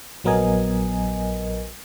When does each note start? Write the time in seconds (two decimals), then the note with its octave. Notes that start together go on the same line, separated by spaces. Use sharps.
0.24 A#1 F#3 B3 A#4 D#5 G#5